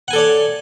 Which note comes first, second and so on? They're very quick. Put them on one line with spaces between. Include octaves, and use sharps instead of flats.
F#5 G#5 A4 D5 C#5